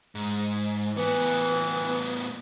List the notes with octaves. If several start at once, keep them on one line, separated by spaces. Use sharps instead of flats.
G#2
A2 E3 B3